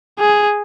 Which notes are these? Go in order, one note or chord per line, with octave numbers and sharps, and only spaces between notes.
G#4